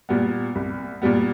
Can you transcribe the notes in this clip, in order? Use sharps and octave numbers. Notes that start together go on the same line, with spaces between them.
A#2 G3 B3
C2
A#2 G3 B3